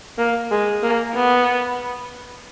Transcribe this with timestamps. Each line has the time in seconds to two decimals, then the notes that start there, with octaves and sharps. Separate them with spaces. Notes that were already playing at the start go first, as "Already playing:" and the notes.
0.18 A#3
0.51 G#3
0.83 A#3
1.15 B3